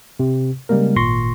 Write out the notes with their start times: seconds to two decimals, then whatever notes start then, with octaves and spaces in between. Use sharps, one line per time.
0.20 C3
0.69 C#3 G3 G#3 A#3 A#4
0.96 G#1 A#2 C6 C#6 A#6